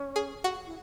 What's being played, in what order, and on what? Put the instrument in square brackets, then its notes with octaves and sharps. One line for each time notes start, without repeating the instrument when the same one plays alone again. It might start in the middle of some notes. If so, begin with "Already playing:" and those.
Already playing: [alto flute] C#4
[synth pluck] G#4
F#4
[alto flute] E4